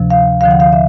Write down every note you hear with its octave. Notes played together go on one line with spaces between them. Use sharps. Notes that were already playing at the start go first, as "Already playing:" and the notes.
Already playing: D2 C3 F3
F5
D2 D3 F3 F5
F#5
F5
E5